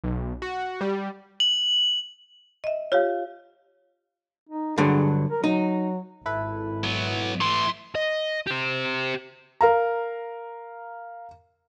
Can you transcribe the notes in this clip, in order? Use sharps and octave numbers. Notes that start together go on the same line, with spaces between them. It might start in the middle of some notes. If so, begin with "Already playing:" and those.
B1
F#4
G3
F#7
D#5 E5
F4 G4 C#5 F5
D#4
G2 D3 F#3 G#4
A#4
F#3 D#4
G#1 E4 A4 B4
F#3 B3
E3 A3 C6
D#5
G4 C5
A#4 F5 A#5